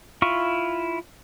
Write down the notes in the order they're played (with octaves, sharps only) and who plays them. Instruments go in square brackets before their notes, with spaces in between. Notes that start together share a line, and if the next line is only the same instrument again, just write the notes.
[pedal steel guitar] E4 F4 C#6